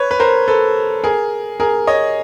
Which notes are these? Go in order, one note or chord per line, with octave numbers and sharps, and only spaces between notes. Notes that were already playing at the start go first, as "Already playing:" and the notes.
Already playing: B4 C#5
B4
A#4 C5
A4 B4
G#4 A#4
G#4 A#4
C#5 D#5